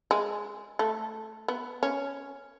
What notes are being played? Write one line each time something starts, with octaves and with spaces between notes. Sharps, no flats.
G#3
A3
B3
C#4